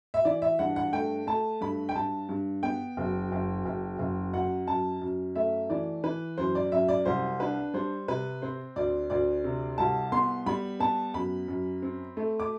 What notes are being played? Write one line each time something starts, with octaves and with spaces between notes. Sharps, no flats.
E5
E3 D5
E5
G2 F#5
F#5
A3 G5
A3 A5
G2 B5
G5
G2 A5
G2
B3 G5
F#1
F#1
F#1
F#1
F#2 F#5
F#2 A5
F#2
A3 E5
E3 D5
E3 B4
F#2 C5
D5
F#2 E5
D5
C2 C5
D4 B4
G3 C5
C3 B4
C4 C5
D2 D5
D2 D5
C3
C2 A5
B3 C6
G3 B5
B3 A5
F#2 B5
F#2
C4
A3
D6